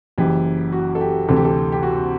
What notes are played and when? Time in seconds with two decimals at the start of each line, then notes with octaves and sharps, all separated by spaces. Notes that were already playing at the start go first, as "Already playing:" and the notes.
0.18 F#1 F#2 E3 G4
0.72 F#4
0.95 A4
1.01 G4
1.28 D2 C3 E3 A4
1.36 G4
1.45 A4
1.72 G4
1.83 F#4